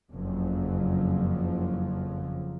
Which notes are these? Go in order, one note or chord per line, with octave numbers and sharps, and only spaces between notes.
F#1 F2 F3 F#3